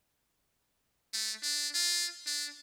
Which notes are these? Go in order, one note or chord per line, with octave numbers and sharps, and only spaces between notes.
A3
D4
F4
D4